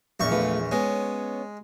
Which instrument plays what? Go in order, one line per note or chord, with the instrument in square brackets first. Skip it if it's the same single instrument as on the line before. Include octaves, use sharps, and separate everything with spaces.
[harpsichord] A#1 E2 C#6
[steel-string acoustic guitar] A3 F4 B4
[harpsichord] G#3 [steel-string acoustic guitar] B3 C#4 C#5